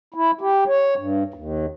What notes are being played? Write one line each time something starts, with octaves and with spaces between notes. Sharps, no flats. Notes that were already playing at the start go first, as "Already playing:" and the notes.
E4
G4
C#5
G2
D#2